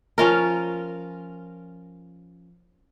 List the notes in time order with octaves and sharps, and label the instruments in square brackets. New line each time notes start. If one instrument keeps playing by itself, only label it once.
[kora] F3 C#4 F4 A#4